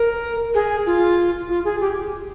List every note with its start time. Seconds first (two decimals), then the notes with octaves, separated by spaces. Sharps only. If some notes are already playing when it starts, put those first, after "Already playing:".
Already playing: A#4
0.54 G#4
0.86 F4
1.49 F4
1.65 G#4
1.81 G4